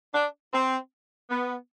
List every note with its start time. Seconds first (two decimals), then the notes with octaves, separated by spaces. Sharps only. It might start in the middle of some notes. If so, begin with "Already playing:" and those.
0.14 D4
0.53 C4
1.30 B3